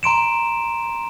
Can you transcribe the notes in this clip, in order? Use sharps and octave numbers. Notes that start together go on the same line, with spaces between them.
A#5 C6 D7 E7